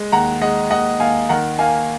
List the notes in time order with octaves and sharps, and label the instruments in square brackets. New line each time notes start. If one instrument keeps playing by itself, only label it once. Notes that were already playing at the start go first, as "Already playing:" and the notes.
Already playing: [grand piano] G#3
D#2 F#5 A#5
G#3 D#5 F#5
D#2 D#5 F#5
D#2 F5 G#5
D#3 F#5 A#5
A#3 F5 G#5